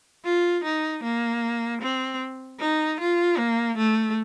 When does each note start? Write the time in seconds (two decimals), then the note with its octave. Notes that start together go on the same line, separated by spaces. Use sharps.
0.24 F4
0.64 D#4
1.03 A#3
1.81 C4
2.60 D#4
3.00 F4
3.38 A#3
3.77 A3